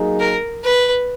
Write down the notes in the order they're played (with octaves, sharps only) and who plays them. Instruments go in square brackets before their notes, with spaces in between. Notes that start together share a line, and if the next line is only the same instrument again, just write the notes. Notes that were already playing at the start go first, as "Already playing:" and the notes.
Already playing: [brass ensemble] F#3 A#3 D#4 G#4
[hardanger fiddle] A#4
B4